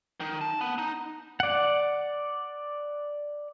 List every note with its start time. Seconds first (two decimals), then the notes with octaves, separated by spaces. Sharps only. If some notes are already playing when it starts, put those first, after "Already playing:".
0.20 D#3
0.41 A5
0.61 B3
0.78 D#4
1.40 D5 F#5